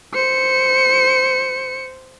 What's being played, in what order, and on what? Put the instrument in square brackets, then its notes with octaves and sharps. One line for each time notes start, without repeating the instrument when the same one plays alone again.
[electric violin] C5 C#7